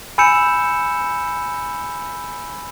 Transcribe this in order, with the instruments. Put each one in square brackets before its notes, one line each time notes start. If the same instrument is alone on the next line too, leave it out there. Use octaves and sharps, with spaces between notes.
[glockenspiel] G#5 B5 E6 G6 C#7 E7